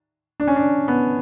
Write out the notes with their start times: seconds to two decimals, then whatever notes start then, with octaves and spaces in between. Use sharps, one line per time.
0.40 D4
0.48 C#4
0.56 D4
0.88 B3